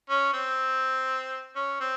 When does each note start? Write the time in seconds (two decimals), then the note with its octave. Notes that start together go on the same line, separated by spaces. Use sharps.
0.10 C#4
0.34 C4
1.56 C#4
1.81 C4